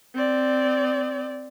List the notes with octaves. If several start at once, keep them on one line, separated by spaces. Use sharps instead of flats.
C4 D5